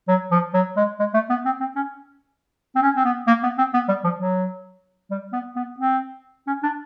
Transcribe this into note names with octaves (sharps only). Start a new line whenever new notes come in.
F#3
F3
F#3
G#3
G#3
A3
B3
C4
C4
C#4
C4
C#4
C4
B3
A#3
B3
C4
B3
G3
F3
F#3
G3
B3
B3
C4
C#4
D4